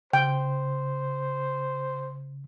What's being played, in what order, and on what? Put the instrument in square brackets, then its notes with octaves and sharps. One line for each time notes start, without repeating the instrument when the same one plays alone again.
[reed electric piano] C#3 [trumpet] C5 [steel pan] G5